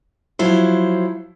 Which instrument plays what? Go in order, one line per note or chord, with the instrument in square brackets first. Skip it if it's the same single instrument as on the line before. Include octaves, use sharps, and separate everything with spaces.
[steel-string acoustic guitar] F3 F#3 C5 [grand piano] E4